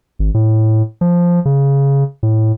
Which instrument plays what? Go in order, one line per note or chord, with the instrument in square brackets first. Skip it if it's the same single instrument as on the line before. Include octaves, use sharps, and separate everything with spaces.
[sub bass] G#1
A2
F3
C#3
A2